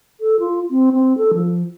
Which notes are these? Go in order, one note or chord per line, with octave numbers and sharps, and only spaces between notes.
A4
F4
C4
C4
A4
F3